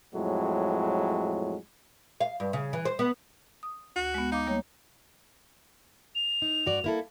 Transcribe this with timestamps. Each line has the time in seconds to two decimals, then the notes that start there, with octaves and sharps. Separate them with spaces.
0.14 F2 A2 F#3 G#3
2.21 F5
2.40 G2
2.53 C#3
2.73 E3
2.85 C5
2.99 B3
3.63 D#6
3.96 D2 F#4
4.14 G#3 B3
4.32 D#4 F5 D6
4.47 G3 A#3 C#5
6.15 F7
6.42 D#4
6.66 G2 F#4 D5
6.84 A#3 E4 A4